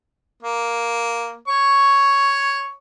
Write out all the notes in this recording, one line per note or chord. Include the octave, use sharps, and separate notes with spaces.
A#3
C#5 C#6